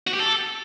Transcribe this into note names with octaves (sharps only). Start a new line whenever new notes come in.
F#4
G4
A4